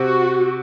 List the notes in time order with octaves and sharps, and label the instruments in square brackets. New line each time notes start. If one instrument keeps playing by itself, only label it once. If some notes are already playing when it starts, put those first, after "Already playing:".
Already playing: [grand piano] C3 [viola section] F#4